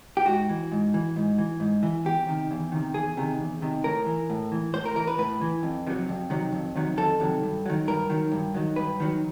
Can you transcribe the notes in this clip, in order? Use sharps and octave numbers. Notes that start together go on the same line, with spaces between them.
G4
G#2 F#4
E3
G#2
E3
G#2
E3
G#2
E3
E2 G4
C3 D#3
E2
C3 D#3
E2 G#4
C3 D#3
E2
C3 D#3
A2 A#4
E3
A2
E3
A2 C5
A#4
E3 A#4
B4
A2 B4
E3
F2
C3 D#3 F#3
F2
C3 D#3 F#3
F2
C3 D#3 F#3
F2 A4
C3 D#3 F#3
G2
D#3 F#3
G2 A#4
D#3 F#3
G2
D#3 F#3
G2 B4
D#3 F#3